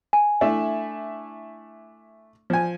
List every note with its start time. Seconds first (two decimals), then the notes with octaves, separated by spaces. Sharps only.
0.13 G#5
0.41 A3 D4 E4
2.50 F3 G#5